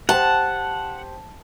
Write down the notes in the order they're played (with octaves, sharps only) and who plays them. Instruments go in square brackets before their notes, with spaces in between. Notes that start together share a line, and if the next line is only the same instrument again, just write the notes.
[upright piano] G4 C5 [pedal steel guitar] F#5 [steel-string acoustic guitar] A5